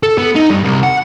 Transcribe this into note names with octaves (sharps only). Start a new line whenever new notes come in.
A4
B3
D#4
G2
C2
F#5